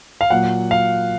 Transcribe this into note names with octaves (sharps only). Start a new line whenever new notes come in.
F5
A#2 F#3 F#5
F5